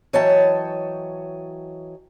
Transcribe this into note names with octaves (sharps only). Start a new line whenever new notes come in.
E3 F#3 C#5 D#5 G5 A5